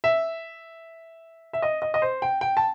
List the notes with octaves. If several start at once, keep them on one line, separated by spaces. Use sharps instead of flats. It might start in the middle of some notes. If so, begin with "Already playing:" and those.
E5
E5
D#5
D#5
D#5
C5
G5
G5
A5